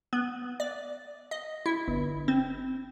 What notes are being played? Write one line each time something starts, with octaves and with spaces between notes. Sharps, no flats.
B3
D5
D#5
E4
G1
C4